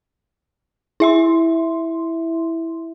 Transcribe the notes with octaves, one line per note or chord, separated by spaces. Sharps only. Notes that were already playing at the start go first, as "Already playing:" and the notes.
E4 E5 C6